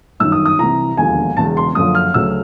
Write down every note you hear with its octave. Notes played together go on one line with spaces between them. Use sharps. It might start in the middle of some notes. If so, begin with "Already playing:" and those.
G1 F#2 D#3 E6
D#6
D#6
C2 C3 E3 A#5
E1 D#2 D3 F3 G#5
E1 E2 C#3 A5
C6
F#1 F#2 D3 F3 D#6
F6
D2 C#3 F#3 E6